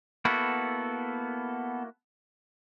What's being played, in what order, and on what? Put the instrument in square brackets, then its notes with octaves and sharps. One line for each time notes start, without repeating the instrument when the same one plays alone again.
[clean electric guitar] A#3 E4 F#4 [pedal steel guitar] B3 A4